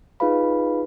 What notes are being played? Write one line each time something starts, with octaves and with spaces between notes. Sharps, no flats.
D#4 F4 G#4 B4 F5 B5